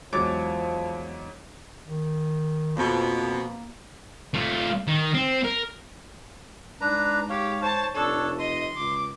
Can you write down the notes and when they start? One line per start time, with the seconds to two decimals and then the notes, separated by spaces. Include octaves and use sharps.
0.13 E2 G#2 F3 F#3 G#3 C#5 D6 A6
1.86 D#3
2.77 F2 B2 A#3
4.34 A3 F4
4.88 D#3
5.14 C4
5.45 A#4
6.81 G#2 D4 B4 A#5
7.30 G4 C#5 F5
7.62 C5 C#5 A5
7.95 F1 D4 A4 C#5
8.39 D#5 C6
8.76 C#2 D6